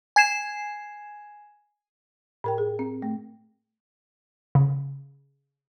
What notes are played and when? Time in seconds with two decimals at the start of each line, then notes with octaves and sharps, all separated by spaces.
0.16 G#5 G#6 C7 E7
2.44 A2 A#4 G5
2.58 G#4
2.79 C4
3.02 A3
4.55 C#3